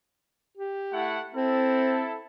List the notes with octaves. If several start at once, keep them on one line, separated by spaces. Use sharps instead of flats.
G4
A3 E4 F#5
C4 E4 A4